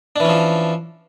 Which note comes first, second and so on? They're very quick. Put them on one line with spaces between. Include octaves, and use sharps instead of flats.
D4 E3 C#4 F3